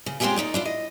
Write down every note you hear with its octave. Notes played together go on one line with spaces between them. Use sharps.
C#3
G#3 C4 C#4 F4 G4 G#4
D#2 B2 D#4 D5
D4 E4 F4
D#5